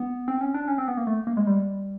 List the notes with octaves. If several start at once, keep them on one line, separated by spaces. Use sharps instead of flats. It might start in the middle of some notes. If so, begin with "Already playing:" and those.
Already playing: B3
C4
C#4
D4
C#4
C4
B3
A#3
A3
A#3
G#3
G3